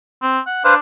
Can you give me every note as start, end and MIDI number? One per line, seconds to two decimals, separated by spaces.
0.23 0.39 60
0.46 0.60 78
0.64 0.79 62
0.64 0.74 71
0.64 0.74 72
0.64 0.74 77